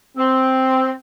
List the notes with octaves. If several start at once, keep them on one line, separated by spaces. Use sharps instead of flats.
C4